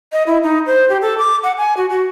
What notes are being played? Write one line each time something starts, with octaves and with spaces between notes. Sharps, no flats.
D#5
E4
D#4
C5
G4
A4
D6
F#5
G#5
F#4
F#4